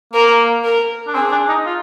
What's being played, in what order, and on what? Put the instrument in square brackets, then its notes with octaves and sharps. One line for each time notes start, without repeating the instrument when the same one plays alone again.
[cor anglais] A#3 [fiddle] A#4
[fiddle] A#4
[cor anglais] D4
[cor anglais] C4 [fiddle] G#4
[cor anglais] D4
D#4
F4